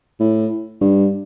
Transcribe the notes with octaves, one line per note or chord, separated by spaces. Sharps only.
A2
G2